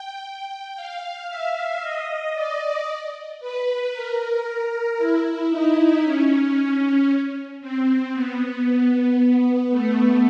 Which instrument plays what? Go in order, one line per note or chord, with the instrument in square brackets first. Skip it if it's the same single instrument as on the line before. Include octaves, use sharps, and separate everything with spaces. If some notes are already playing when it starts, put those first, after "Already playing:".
Already playing: [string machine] G5
G5
F5
E5
D#5
D5
B4
A#4
E4
D#4
C#4
C4
B3
A3